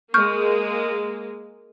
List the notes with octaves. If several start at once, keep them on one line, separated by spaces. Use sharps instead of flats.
G#3 A#3 C#6 F6 G6